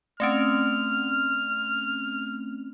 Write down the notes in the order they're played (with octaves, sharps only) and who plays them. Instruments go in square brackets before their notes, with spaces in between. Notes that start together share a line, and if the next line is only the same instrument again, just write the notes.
[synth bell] A3 C4 C#4 [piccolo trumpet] F6